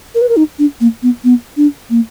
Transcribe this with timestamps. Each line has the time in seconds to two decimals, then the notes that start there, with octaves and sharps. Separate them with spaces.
0.15 A#4
0.21 B4
0.29 A#4
0.37 D#4
0.59 D4
0.81 A#3
1.03 B3
1.24 B3
1.57 D4
1.90 A#3